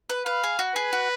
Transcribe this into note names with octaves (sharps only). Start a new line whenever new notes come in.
B4
B4 F5
G#4
F#4
G#4 B4
F#4